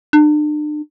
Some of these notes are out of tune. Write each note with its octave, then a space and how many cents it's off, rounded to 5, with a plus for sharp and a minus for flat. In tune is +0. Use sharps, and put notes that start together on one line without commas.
D4 +40